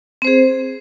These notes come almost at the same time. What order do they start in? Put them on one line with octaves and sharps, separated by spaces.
C4 C5 G#4